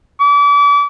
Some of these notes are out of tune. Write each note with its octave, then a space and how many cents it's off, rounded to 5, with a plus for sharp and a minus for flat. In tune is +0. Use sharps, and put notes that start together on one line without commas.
D6 -35